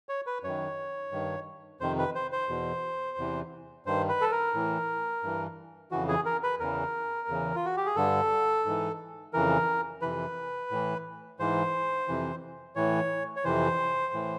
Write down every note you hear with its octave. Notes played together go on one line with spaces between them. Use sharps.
C#5
B4
F#2 D#3 C#5
G2 D#3
F2 C3 D#3 C5
B4
C5
C5
E2 B2
E2 C3 E3
G2 D#3 C5
B4
A4
A#4
A2 E3
G2 E3
F2 C#3 E3 F#4
G#4
A#4
B4
E2 C#3 E3 A#4
E2 C#3 E3
F4
F#4
G4
G#4
G2 D3 A4
G#2 E3
F2 C#3 E3 A#4
F2 C3 E3 B4
A2 E3
G#2 E3 C5
F2 C3 E3
A2 E3 C#5
C#5
F2 C3 E3 C5
A2 E3